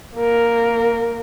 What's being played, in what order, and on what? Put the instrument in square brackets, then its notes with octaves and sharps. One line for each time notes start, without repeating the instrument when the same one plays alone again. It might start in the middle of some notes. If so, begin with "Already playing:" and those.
[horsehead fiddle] A#3 A#4